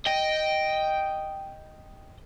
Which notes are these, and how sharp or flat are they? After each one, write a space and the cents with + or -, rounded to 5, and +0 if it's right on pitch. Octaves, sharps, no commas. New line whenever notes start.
D#5 +0 G5 +0